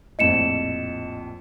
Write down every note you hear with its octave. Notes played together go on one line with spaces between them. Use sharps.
A#1 F2 A2 D#5 C#7 E7